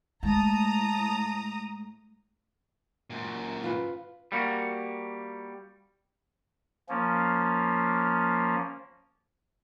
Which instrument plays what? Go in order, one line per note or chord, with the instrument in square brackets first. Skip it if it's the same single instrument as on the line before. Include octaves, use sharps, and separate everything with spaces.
[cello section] A2 A3 [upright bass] G#3 [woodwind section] A5 [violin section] A#5 D#6
[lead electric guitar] F#2 A#2
[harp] F4 B4
[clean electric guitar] G3 A#3 F#4
[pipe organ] F3 A#3 C#4